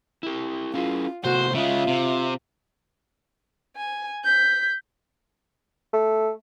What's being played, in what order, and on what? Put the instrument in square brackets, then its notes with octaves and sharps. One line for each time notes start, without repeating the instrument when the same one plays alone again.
[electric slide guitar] E4 G4
[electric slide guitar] C#4 E4 G#4 [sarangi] F4
[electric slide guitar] C3 A3 B3 [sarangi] F#4 [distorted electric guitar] C5
[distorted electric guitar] C#3 G#3 [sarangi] F4 [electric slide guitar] E5
[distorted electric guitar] C3
[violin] G#5
G6 B6
[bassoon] A3